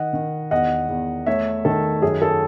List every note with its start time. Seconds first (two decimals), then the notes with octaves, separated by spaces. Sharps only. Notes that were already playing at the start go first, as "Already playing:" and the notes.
Already playing: D#3 D#5 F#5
0.13 D#3
0.51 E2 D#5 F#5
0.89 E2
1.26 A3 C#5 E5
1.65 D#3 A4
2.02 F#2 G#4
2.22 A4